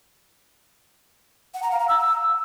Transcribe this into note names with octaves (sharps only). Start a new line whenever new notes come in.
F#5
A#5
F5
A#5
E6